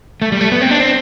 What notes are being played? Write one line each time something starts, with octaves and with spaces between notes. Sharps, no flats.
A3
G3
A3
B3
C4
D4
C4